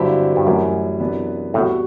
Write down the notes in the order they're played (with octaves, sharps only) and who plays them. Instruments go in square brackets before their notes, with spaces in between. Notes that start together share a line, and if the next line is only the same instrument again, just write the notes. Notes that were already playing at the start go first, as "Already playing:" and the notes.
Already playing: [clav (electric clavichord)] G2 [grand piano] D3 F#3 C4 E4 G4
[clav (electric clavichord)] G2
[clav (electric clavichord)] F#2 [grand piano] A2 E3 G3
[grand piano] C3 E3 B3 D4
[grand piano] E2 C3 G3 B3 F#4 [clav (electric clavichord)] A2